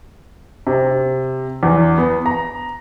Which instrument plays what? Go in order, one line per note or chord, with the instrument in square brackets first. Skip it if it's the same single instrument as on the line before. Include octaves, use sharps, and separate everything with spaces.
[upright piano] C3
E2
B3
A#5